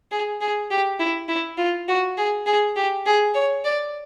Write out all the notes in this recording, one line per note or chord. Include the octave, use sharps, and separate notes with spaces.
G#4
G#4
G4
E4
E4
F4
F#4
G#4
G#4
G4
G#4
C#5
D5